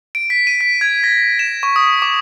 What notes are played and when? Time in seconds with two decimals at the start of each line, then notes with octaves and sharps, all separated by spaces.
0.15 D7
0.30 B6
0.47 D#7
0.61 B6
0.81 G#6
1.03 A#6
1.39 E7
1.63 C#6
1.76 D#6
2.02 D6